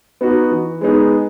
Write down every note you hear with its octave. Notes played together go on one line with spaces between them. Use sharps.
B3 D#4 F#4
E3
G#3 B3 D#4 G#4